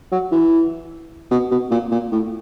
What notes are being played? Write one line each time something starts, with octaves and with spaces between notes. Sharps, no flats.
F#3
E3
B2
B2
A#2
A#2
A2